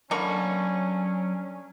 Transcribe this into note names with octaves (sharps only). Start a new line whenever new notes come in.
D3 F#3 A#3 C#4 B5 C#6